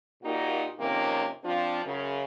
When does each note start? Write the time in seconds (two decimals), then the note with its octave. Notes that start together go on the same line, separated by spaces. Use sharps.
0.23 A#2 A#3 D#4 F#4 G4
0.79 F2 C3 D#3 A#3 C#4
1.43 F3 C4 D4 F4
1.84 F#2 C#3